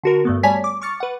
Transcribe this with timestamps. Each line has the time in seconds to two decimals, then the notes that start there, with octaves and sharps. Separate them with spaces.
0.03 D3 F#4 A#4
0.25 G2 A3 B3
0.43 G3 C#5 D5 G#5 A5 B6
0.64 D6
0.82 C#6 D6 F6 A6 C#7
1.00 B4 F#5